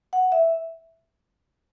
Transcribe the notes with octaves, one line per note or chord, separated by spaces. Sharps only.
F#5
E5